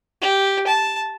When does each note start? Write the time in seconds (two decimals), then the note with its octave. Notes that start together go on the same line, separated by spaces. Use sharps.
0.22 G4
0.67 A5